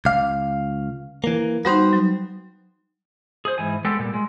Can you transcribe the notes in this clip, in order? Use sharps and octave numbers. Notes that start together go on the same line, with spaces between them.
C#2 F5 D6
E3 A#3
G3 B3 D#4 F#4 C5
F#3
G#4 C5
G#2 E3 G#5
G#3 B3 G4 A4
A#2 G3
G#3